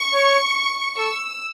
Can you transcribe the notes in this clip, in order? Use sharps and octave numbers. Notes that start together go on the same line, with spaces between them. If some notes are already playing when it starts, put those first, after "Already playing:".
Already playing: C#6
C#5
A4 E6